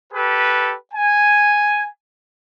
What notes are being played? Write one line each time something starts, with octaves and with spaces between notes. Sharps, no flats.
G4 A4 B4
G#5